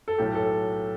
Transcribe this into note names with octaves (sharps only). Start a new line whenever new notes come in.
A4
B1 A2 F#3 G4
A4